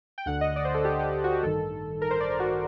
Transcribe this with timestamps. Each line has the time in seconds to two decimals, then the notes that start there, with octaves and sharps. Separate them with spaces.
0.18 G5
0.26 D2 D3 F#5
0.41 D#5
0.56 D5
0.65 C5
0.74 A4
0.85 G4
0.99 G4
1.13 G4
1.24 F#4
1.32 G4
1.42 A1 G2 D#3 A4
2.02 A#4
2.11 C5
2.20 D5
2.30 A#4
2.40 F#4